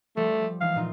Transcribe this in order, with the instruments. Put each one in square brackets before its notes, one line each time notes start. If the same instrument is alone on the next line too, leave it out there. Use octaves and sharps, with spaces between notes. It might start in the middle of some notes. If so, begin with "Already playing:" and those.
[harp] F3 G3 [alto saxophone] A3
[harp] E3 G#3 D#4 [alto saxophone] F5
[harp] A#2 D#4 F4